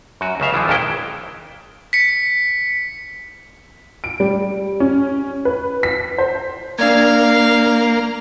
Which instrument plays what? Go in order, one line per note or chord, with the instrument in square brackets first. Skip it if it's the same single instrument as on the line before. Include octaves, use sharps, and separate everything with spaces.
[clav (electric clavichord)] F#2 F#4
C#2 C#3 E5 F5
B1 E3 F3
A#1 F2 D#3 G#3 E4 G5
[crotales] B6 C#7
[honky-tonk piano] D7
G3
C#4
B4
B6
C5
[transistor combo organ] A#3 [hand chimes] D4 D5 G#6 [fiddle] F5